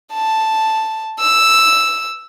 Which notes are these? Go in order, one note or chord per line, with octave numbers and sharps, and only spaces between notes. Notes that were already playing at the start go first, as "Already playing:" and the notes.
A5
E6